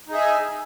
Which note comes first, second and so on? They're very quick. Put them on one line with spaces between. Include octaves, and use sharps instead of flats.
D#4 G#4 E5 G#5